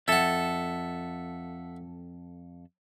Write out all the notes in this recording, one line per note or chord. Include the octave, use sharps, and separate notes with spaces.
F2 A4 E5 F#5